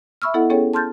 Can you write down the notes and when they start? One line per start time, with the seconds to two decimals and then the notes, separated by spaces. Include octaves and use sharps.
0.22 E5 B5 C#6 E6 F6
0.34 B3 E4 A4 D#5 F#5
0.50 B3 C#4 G#4 A4 C#5 G5
0.74 A5 C6 F6 G6 A6